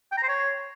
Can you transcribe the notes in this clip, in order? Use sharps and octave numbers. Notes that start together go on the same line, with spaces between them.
G5
A#5
C5
C#5